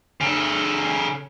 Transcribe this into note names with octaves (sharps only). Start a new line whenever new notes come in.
C#3 A4